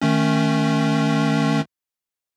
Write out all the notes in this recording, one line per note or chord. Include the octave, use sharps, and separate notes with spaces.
D#3 A3 C#4